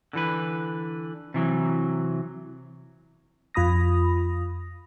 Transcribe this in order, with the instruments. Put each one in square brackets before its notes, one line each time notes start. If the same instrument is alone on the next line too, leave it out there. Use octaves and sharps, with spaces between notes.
[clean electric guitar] D3 E3 B4
C3 E3 F#3
[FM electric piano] F2 F4 B5 D#6 A#6